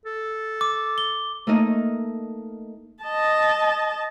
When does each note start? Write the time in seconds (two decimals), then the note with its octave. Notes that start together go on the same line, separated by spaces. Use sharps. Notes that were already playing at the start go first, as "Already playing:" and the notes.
0.05 A4
0.61 D6
0.98 G7
1.47 A3 A#3 D#4 D#5
3.03 D#5 A5